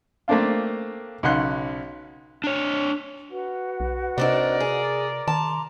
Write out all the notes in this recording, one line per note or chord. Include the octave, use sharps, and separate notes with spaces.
A3 A#3 C4 D4 F4
B1 C#3 F#5 C6 F#6
D4 C#5
F#4 B4 F#5
B1
C3 C4 D4 D#4 A#4 D5
G#4
D#3 A5 A#5 C6 D6